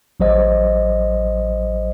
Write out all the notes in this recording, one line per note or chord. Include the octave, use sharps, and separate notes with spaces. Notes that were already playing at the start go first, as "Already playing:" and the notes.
A1 F#3 C5 D#5